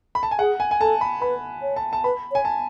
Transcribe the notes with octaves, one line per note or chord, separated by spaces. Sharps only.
B5
A5
G#5
G#4 F#5
G#5
G#5
A4 A5
B5
B4 B5
C#5
A5
A5
B4 B5
C#5
G#5
A5